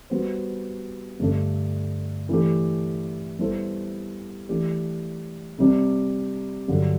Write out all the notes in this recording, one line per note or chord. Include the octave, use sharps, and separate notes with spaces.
G3 B3 F#4 C5
G2 D3 A3 D4
E3 A3 D4 G4
G3 B3 E4 A4 C5
E3 A3 D4 G4
C3 G3 D4
G2 D3 F#3